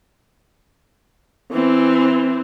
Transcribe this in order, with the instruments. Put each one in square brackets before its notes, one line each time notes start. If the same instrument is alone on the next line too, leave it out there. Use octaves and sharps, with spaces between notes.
[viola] E3 C4